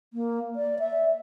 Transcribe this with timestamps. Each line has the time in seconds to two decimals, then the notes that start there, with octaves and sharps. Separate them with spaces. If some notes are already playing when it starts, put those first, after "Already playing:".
0.13 A#3
0.56 D5
0.79 E5